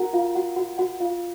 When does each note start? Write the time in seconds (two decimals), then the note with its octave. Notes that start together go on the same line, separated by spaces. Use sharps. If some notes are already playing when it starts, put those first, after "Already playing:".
Already playing: F#4 A#4 F#5 A#5
0.13 F4 F5
0.35 F#4 F#5
0.56 F#4 F#5
0.78 F#4 F#5
1.00 F4 F5